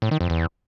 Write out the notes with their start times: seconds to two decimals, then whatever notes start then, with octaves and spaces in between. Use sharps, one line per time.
0.02 A2
0.11 D#3
0.21 F2
0.30 E2